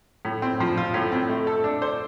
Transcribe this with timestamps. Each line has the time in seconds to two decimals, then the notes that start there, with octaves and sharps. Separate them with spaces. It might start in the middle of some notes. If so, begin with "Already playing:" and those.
0.25 A2
0.42 C4
0.60 F3
0.77 F4
0.94 A2
1.12 C4
1.29 A3
1.47 A4
1.64 D4
1.82 C5